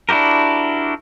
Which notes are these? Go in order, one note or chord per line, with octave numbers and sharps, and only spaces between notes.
D4 E4 F#4 G4 A#4